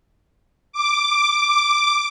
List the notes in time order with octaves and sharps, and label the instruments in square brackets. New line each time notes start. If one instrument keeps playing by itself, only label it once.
[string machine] D6